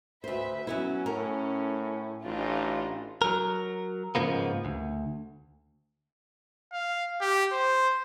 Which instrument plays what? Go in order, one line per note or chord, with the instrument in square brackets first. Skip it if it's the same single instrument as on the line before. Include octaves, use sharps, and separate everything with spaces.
[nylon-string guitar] D2 C5 [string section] B4 E5
[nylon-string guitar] F#3 B3 E4 [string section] C#4
[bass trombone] A2 [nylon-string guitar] A#4
[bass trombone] A1 [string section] D4 D#4 F4
[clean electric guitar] F#3 A#4
G#2 C#3 F3 A#3 B3
D2
[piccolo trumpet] F5
G4
C5